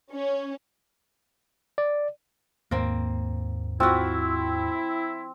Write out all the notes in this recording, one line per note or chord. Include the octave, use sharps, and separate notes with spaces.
C#4
D5
D#2 G#2 A#3 C4
F3 C4 E4 F#4